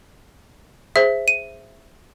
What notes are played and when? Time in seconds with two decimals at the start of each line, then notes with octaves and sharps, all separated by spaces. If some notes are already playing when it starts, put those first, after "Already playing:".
0.96 G#4 C5 E5
1.28 D#7